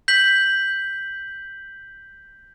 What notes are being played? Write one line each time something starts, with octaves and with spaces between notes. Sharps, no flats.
G6 B6 F#7